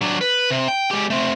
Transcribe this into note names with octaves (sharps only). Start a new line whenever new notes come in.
F#3 D4
B4
C3
G5
G#3 G4
A3 C4